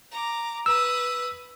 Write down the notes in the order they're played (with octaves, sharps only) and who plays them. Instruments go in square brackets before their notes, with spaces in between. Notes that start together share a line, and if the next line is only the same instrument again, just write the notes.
[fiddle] A#5 D6
[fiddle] B4 D#6 [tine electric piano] E6